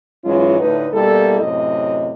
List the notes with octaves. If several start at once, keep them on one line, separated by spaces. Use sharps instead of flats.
G#2 E3 F#3 G#3 C#4 F4
D2 A2 D#4 B4
B2 G3 A#3 E4 A4
F#2 A2 C3 D#5